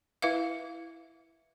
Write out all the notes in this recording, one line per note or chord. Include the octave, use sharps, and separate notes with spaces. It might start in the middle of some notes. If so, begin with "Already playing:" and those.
E4 B4 E5 F5